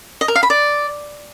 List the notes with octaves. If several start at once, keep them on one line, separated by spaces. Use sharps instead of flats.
D#5
A#4
F5
B5
D5